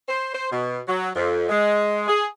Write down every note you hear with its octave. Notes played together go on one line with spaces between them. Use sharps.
C5
C5
B2
F#3
F2
G#3
G#4